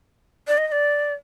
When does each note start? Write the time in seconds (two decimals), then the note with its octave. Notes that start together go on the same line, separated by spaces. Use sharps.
0.48 D5
0.58 D#5
0.68 D#5
0.72 D5